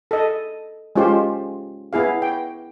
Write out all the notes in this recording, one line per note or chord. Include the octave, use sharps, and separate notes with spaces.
A4 D#5
G#3 C#4 F4 G4 C5
B3 E4 G#4 F5
G5